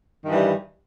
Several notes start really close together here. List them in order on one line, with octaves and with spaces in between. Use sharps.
D#3 G2 E3 G3